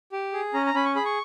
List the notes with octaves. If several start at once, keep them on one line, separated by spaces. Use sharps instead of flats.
G4
G#4
C#4 A#5
A#5
C#4 B5
C#6
G#4 B5
C#6